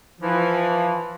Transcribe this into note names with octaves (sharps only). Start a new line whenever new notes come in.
E3 F3